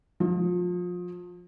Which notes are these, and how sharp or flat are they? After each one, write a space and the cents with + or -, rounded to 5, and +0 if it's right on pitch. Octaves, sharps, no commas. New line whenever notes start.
F3 +30